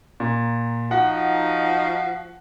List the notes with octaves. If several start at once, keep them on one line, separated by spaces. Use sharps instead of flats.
A#2
F3 D#4 F#4 F#5